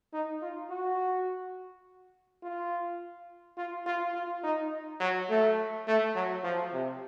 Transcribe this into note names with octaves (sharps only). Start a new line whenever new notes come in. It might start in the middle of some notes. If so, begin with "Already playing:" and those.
D#4
F4
F#4
F4
F4
F4
F4
D#4
F#3
A3
A3
F#3
F3
C3